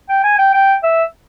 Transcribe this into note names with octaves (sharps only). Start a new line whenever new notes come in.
G5
G#5
G5
G5
E5